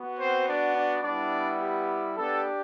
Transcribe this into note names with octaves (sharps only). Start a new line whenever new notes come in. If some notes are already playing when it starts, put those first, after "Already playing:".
Already playing: B3 F#4
C4 C5
D4 D5
D4 D5
G3 B3 D4 E4 D5
G4
B3 D4 G4 A4